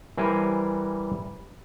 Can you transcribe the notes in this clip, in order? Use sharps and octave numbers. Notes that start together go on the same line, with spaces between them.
E3 G3 A#4 C5 G#5